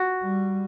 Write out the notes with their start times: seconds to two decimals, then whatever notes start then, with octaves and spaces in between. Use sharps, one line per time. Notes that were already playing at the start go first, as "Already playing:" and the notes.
Already playing: F#4
0.22 G3